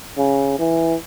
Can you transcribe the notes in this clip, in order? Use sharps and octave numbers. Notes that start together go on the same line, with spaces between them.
C#3
E3